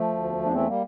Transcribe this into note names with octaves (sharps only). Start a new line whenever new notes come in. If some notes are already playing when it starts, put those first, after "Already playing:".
Already playing: F3 A3
D2
E2
E2
D4
E3 A3 C4
G3 A#3